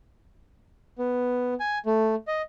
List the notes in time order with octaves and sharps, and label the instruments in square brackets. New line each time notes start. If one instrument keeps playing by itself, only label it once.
[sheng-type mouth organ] B3
G#5
A3
D#5